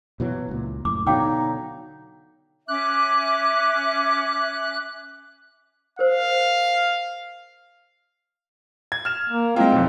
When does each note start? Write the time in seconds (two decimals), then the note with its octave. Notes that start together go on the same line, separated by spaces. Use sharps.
0.20 B2 E3 F#3
0.49 C#2 A#2
0.85 F#2 A2 D6
1.07 B2 D3 F#3 D#4 F5 G5 D6
2.68 C#4 E5 D6 F#6
5.99 A#4 C5 F5
8.92 G#6
9.05 F6 E7
9.30 A#3
9.56 G#3 C4 E4 F4
9.72 B1 F2